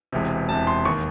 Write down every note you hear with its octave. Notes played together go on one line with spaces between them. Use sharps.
E1 E2 C3
E1 E2 C3 A5
C6
D#2 D#3 C#6